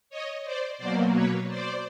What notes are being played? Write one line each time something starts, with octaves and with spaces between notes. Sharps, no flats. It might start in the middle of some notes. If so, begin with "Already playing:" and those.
C#5 D#5
C5 D5
B2 F#3 A#3 C5 D5
B4 C#5
C5 D5